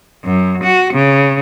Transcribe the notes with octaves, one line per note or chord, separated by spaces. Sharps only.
F#2
F#4
C#3